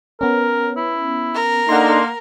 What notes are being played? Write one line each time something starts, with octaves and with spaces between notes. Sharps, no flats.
B3 C#4 A#4
E4
A#4
A#3 D4 D#4 A4 F#5 C6